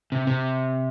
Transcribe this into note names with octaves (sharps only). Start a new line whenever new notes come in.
C3
C3